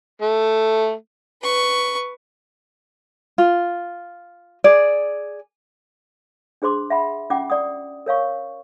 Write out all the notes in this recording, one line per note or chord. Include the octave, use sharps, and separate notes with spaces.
A3
B4 C#6
F4
G#4 D5
D4 G#4 C5 C6 D6
E5 F#5 B5
C#4 F4 F#5 G5 D6
D5 F#5 D#6
A#4 C#5 F5 C#6